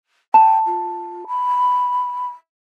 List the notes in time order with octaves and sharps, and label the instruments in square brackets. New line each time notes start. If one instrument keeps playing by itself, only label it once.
[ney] G5 [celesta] A5
[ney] F4
B5